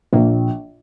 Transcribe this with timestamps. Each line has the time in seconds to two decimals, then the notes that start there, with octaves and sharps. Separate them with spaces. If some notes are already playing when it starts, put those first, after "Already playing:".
0.13 A#1 A#3